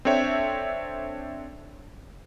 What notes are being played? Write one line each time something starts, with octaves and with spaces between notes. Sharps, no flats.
C4 D4 A4 C#5 E5 G5